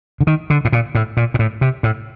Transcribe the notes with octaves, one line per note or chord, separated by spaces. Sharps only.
D3
D#3
D3
A2
A#2
A2
A#2
A#2
A2
C3
A2